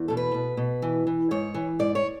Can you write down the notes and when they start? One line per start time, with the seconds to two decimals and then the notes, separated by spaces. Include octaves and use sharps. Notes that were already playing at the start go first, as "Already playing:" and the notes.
Already playing: E2
0.08 B2 A4
0.17 B4
0.34 B2
0.57 B2
0.82 E3
1.07 E3
1.31 G#2 C#5
1.54 E3
1.79 G#2 D5
1.95 C#5